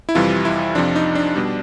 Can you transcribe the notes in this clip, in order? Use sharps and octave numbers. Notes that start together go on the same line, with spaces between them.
E4
F2 C3 E3 G3 F4
E4
F2 C3 F3 D4
D#4
D4
B2 G3